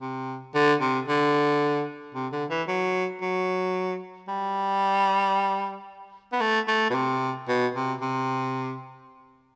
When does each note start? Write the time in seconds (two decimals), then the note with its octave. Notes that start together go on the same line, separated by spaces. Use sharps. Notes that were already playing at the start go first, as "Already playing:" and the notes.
0.01 C3
0.55 D3
0.81 C3
1.08 D3
2.15 C3
2.32 D3
2.50 E3
2.68 F#3
3.21 F#3
4.28 G3
6.32 B3
6.41 A3
6.68 A3
6.90 B2
6.95 C3
7.48 B2
7.75 C3
8.01 C3